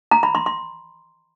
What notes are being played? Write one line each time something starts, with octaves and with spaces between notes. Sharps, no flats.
A#5
B5
C6
C6